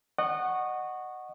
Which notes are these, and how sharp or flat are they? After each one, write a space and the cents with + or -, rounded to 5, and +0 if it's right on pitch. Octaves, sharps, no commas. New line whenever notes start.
D#5 -30 F#5 +0 C#6 -5